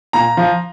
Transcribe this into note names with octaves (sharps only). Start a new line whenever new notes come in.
A#2 A#5
F3